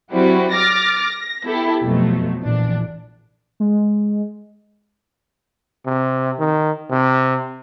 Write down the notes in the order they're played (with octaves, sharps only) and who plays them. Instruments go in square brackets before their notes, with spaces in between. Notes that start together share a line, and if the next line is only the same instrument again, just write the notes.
[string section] F#3 G3 C4 E4 F#4
D6 F6 A6 A#6
A#6
B3 E4 G4 A4
F2 B2 F3 F#3 A3
A#1 E3 D4
[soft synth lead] G#3
[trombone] C3
D#3
C3